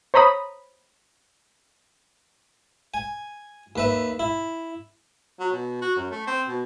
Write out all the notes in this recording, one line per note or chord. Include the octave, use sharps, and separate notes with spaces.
C5 C#5 A#5 B5 D#6
G#5
D#2 B4 E5
E4
F#3
B2
F#4
F#2
A3
C4
B2